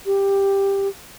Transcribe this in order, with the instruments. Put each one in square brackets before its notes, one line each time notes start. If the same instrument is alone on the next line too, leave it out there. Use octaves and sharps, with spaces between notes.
[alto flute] G4